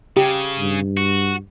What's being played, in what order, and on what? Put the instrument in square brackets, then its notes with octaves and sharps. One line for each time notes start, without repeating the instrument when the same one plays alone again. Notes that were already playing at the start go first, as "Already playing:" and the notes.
[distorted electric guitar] C#3 [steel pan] G4
[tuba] G2
[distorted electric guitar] F#4